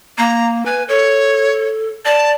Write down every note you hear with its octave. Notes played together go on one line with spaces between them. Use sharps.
A#3 A#5
B4 G#5
A4 C#5
D5 A5